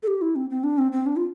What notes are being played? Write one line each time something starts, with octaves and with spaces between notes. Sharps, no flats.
A4
G4
E4
C4
C4
D4
C4
C4
D4
F4